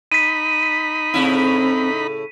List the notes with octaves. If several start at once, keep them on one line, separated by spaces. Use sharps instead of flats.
D#4 B5 B6 D#7
A2 C#3 C4 E4